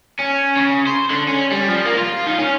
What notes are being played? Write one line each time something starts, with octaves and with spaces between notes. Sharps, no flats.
C#4
C#3
C5
D3
C#4
G3
F3
A#3
F4
D#3
C#4